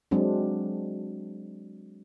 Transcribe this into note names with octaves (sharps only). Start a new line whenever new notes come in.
F#3 G#3 C4 D4